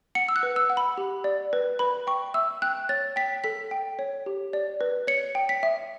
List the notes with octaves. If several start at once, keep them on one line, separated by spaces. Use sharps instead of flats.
F#5 C#7
E6
F#6
B4
E6
F#5
B5
G4
D5
B4
B4 B5
G5 C#6
E5 E6
G5 F#6
C#5 A6
G5 B6
A4 B6
G5
C#5
G4
D5
B4
C#5 C#7
G5
B6
E5